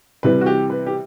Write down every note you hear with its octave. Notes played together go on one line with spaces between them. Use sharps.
C3 E3 G3 B4
F#4
G4
B4
G4